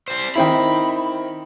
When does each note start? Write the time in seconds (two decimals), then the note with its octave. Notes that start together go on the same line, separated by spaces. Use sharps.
0.08 G3 C5
0.36 D#3 C4 E4 B5